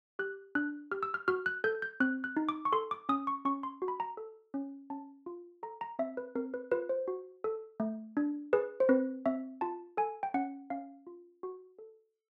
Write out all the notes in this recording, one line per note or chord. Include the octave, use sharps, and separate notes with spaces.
G4 F#6
D4 F#6
G4 F6
E6
F6
F#4 F6
F#6
A4 G6
G6
C4 F#6
F#6
D#4
D6
C#6
A4 C6
D6
C#4 D#6
C#6
C#4 C#6
C6
F#4
B5
A#5
A4
C#4
C#4 A5
F4
A4 A#5
A#5
C4 E5
B4
C4 A#4
B4
F4 B4
C5
F#4
A4
A3
D4
G#4 B4
C5
C4 B4
C4 E5
F4 A5
A4 G#5
G5
C#4 F#5
C#4 F5
F4
F#4
A4